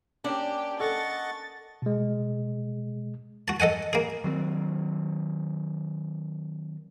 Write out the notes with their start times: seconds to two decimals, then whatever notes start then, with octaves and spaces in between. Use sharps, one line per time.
0.24 A#3 C#4 D4 G4
0.80 A4 D#5 F#5 C#6 A6
1.82 B2 G#3
3.48 F#4 A5
3.60 A4 D#5 F#5 G#5
3.93 A#3 G#4
4.24 D#3 F#3 A3 C4